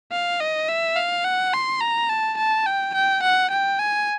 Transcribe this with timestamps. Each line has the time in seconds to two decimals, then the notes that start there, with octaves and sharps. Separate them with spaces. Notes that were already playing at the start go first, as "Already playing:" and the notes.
0.12 F5
0.40 D#5
0.69 E5
0.96 F5
1.25 F#5
1.54 C6
1.81 A#5
2.10 A5
2.37 A5
2.66 G5
2.95 G5
3.23 F#5
3.51 G5
3.79 G#5